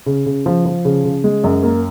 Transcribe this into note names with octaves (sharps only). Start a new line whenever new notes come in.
C#3
C#3
F3
F3
C#3
C#3
G#3
F#2
A#3